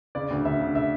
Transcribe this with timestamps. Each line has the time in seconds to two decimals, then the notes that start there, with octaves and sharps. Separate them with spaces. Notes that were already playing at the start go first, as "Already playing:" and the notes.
0.15 C#3 D5
0.31 D2
0.45 D2 E5
0.60 C#3
0.75 E5